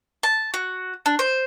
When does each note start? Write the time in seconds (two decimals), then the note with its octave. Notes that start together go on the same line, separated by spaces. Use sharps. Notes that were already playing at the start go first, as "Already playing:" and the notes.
0.23 A5
0.54 F#4
1.06 D4
1.19 C5